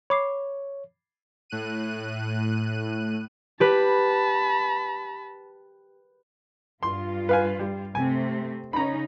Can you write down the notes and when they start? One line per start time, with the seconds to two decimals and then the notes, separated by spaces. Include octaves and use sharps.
0.10 C#5 B5 D6 C7
1.50 A2 F#6 D#7
3.60 G4 B4 A5 B5
6.83 G2 F4 C6
7.29 B4 F5 G#5
7.59 G3
7.95 C3 A3 C4 G#5
8.73 C#3 C#4 D#4 A#5 B5